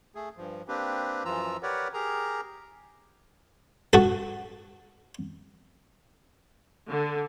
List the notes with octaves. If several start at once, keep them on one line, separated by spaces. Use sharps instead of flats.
A3 G#4
G2 F3
A#3 C4 D4 G4 B4
F#2 E3 F3 F4 A#5 E6
G4 A#4 B4 C#5 D5 F#5
G4 G#4 A#4 A#5
F#4 A4
D3